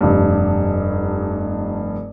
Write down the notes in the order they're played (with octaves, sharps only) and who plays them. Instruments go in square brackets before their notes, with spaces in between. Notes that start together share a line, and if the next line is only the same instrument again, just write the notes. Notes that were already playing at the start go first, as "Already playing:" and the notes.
[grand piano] F1 G2